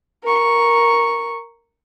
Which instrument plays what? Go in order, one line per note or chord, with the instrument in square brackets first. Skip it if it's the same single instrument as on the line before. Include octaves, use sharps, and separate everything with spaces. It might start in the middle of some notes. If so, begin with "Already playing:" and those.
[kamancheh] A#4 C#6